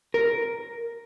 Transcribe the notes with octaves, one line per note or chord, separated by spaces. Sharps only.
A#4